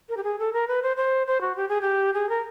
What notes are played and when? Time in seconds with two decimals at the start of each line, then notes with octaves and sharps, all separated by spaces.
0.09 A#4
0.17 G4
0.24 G#4
0.39 A4
0.53 A#4
0.68 B4
0.82 C5
0.97 C5
1.27 C5
1.41 F#4
1.56 G4
1.68 G#4
1.81 G4
2.14 G#4
2.29 A#4